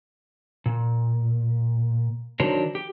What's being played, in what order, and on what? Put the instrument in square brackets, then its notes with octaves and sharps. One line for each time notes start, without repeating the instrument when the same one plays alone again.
[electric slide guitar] A#2
D#3 F#3 D4 A#4 C5 C#5
G4